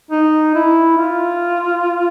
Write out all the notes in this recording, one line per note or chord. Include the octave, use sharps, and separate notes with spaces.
D#4
E4
F4